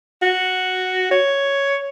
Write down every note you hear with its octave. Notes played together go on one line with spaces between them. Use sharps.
F#4
C#5